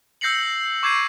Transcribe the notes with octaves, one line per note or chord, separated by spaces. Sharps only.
E6 G6 A#6 C7 C#7 F#7
C#6 D6 G6 G#6 C7 D#7